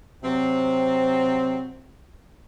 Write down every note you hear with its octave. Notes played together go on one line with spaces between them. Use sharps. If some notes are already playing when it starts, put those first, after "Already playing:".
C3 F#3 C4